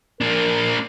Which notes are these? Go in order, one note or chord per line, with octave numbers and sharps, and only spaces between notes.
A#3 D4 A#4